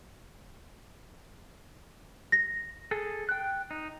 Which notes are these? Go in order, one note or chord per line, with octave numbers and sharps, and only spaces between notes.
A#6
G#4 A4
G5 F#6
D#4